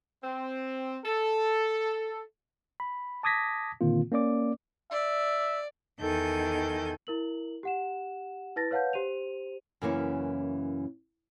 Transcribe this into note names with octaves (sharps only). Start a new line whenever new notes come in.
C4
A4
B5
A5 D6 D#6 G#6 A#6 B6
A#2 D3 D#3 A#3 C4 F4
A#3 C#4 D5 D6
D5 E5
E2 D#3 A4 G#5 G6
E4 A#4 F#7
G4 F#5 E7
E4 B4 A5 A6 A#6
B4 C#5 F5 F#5 A5 G6
G4 C5 D#7 F7
F#2 C#3 E3 A#3 C#4 E4